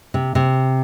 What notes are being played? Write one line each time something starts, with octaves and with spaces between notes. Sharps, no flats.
C3
C3